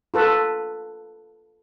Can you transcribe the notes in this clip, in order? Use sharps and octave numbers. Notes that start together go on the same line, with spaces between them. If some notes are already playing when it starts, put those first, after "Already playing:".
F4 A4 B4